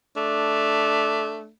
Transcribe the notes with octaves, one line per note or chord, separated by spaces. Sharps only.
A3 D4